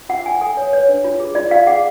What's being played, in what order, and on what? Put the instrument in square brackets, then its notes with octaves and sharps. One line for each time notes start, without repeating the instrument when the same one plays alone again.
[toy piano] F4 F#5
F4 G#5
A4 G#5
C#5
B4 C#5
D4
F4
G#4
F4 D5
F4 F5
G#4 F#5